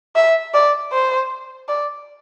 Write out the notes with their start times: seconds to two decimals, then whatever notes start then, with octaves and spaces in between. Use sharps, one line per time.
0.16 E5
0.54 D5
0.92 C5
1.68 D5